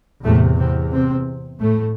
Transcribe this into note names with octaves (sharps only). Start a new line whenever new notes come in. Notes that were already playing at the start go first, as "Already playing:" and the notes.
E2 A2 C3 A3
C3 C4
C3 C4
A2 A3